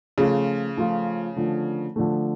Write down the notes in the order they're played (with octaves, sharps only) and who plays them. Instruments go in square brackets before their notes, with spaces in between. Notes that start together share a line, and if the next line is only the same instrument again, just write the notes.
[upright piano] C#3 [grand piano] F3 A3 F4
[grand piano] F3 A3 F4
D3 F3 A3
D3 F3 A3